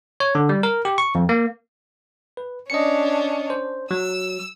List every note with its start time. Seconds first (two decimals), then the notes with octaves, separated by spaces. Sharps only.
0.20 C#5
0.35 D3
0.49 G3
0.63 A#4
0.85 G4
0.98 C#6
1.15 F2
1.29 A#3
2.37 B4
2.70 C#4 D4 D#5 C#7
3.50 C5
3.91 F#3 E6